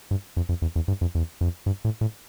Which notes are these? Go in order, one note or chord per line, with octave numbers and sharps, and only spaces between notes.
G2
F2
F2
E2
E2
G2
F2
E2
F2
G2
A2
A2